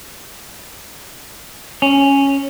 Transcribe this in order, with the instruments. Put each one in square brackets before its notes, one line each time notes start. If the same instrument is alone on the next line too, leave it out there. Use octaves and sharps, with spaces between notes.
[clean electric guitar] C#4